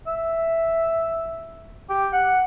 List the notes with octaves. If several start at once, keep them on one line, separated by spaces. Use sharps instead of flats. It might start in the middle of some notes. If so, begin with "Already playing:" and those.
E5
G4
F#5